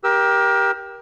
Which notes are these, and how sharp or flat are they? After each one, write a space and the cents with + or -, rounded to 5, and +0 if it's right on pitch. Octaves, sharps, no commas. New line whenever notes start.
G4 +0 A#4 +25 E6 +0